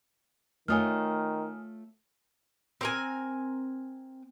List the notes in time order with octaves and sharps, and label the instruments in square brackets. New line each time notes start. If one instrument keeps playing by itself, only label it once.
[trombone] D#3 [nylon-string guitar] A3 F4 C#5 [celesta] G#5 D#6 F6
[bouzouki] C4 A#4 G#5